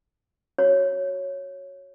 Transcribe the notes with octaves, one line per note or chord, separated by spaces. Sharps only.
F#4 C#5